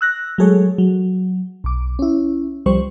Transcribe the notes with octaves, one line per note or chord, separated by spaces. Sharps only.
E6 F#6 A#6
F#3 G#3 A3 G#4 A4 C#5
F#3
B1 D6
C#4 E4
C2 F3 G3 C5 C#6